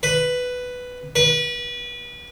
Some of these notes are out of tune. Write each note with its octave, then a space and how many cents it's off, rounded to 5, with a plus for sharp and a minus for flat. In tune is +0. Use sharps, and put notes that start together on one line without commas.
B4 +5
B4 -30